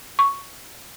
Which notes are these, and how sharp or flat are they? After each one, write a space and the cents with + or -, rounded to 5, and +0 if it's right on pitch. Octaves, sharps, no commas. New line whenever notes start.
C#6 +5